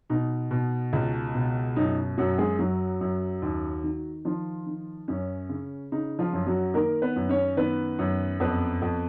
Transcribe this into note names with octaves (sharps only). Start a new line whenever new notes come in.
B2 D#4
B2
C#2
B2
F#2 D#4
F#2 F#3 F#4
G#3 G#4
F#2 F#3 F#4
F#2
D#2
D#3
D#3 F3 F4
D#3
F#2 C#4
C#3
C#3 D#4
F3 F4
F#2
F#3 F#4
D#3 A#3 A#4
B3 B4
F#2
C#4 C#5
D#3 B3 B4
F#2
F2 B3 B4
F2